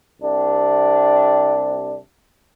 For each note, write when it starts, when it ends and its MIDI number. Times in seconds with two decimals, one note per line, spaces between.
0.22 1.97 36
0.22 1.97 48
0.22 1.97 62